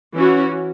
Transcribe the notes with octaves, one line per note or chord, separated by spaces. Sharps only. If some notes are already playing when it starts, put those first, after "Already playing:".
E3 C#4 F#4